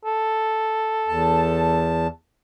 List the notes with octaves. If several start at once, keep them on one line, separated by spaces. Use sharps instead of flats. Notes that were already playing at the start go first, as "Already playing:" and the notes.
A4
E2 A5